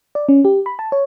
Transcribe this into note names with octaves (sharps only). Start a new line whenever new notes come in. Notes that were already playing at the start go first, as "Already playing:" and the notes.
D5
C#4
G4
B5
A5
C#5